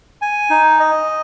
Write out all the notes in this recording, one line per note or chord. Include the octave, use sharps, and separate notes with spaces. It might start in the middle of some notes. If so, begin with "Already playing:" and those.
G#5
D#4
D#5